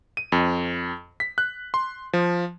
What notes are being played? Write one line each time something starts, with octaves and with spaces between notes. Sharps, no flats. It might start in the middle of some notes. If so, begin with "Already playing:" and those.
D#7
F2
B6
F#6
C6
F3